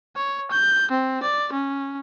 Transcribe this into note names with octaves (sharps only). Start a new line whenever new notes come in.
C#5
G6
C4
D5
C#4